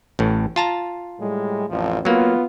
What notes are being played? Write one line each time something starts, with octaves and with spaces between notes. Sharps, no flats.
A1 A2
F4 A5 A#5
A2 G3 G#3
A1 F2 F3
F#3 A#3 B3 F4